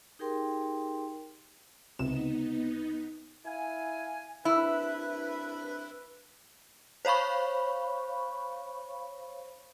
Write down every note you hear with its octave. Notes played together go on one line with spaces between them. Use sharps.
D#4 G4 G#4 A#4 G5 C6
C#2 C3 B3 D#4 E7
E4 F5 G#5
C2 D4 E4 B4
C5 C#5 F5 B5 C#6